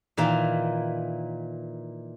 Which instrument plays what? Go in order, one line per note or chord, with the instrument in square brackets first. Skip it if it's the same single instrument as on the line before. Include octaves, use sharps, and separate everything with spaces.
[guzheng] A#2 D#3 E3 A#4 F5